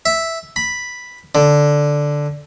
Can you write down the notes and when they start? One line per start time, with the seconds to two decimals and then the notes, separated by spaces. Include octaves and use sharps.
0.06 E5
0.56 B5
1.35 D3